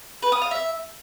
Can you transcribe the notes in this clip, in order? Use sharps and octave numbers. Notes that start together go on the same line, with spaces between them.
B4
D#6
F5
E5